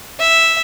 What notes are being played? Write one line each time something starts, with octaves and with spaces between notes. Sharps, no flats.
E5